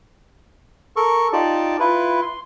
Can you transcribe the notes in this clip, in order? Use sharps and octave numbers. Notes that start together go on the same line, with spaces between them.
A4 A#4 C#6
D#4 F4 G4 D5 A5 D6
E4 F4 B4
C6